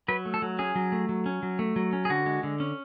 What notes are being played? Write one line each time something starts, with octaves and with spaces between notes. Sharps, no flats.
F#3 B4
A3
A4
F#3
C#4 G#4
F#3
A3
F#3
C#4
F#3
A3
F#3
C#4
G#4
D3 F#4
G#3
D3
C#4